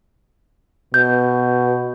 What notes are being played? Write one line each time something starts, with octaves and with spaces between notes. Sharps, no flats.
B2 G6